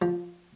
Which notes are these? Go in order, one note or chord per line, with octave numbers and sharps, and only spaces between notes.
F3